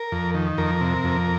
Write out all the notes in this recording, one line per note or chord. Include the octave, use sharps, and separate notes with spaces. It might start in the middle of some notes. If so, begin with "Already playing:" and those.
Already playing: A#4
F2
D#3
F2 A#4
C3
F2